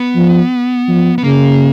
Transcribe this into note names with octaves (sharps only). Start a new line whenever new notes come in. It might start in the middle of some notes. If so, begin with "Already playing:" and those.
Already playing: B3
F3
F3
B3
C#3 A#3